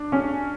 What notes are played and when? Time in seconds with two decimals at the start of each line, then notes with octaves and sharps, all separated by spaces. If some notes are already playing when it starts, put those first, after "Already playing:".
Already playing: D4
0.12 C#4